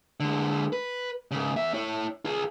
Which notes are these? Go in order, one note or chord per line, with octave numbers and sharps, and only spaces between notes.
D3 G#3
B4
G#2 C#3
E2 E5
E4 C#5
F4 G#4